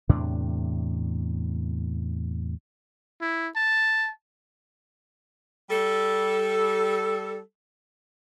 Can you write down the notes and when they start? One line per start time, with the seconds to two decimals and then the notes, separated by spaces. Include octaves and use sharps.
0.09 E2 A2 C3 D4
3.21 E4
3.56 A5
5.70 G3 A4